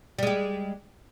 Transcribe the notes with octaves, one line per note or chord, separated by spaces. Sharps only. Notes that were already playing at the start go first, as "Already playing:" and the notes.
G3 G#3 G4